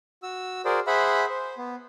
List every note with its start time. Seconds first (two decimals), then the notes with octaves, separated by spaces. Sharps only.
0.23 F#4 E6
0.65 F#4 G#4 A#4 C5 D5
0.87 G#4 C5 E5 F#5 B5
1.30 C5
1.58 B3